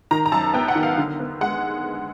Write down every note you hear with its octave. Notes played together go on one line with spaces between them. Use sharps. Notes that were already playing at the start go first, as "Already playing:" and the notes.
D#3 A#5
A#5
F#2 A5
B3 G5
F#5
D#3
F5
D3
B3
G#3 F#5